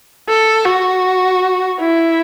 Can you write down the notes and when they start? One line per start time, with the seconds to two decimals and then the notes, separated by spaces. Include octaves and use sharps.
0.29 A4
0.66 F#4
1.80 E4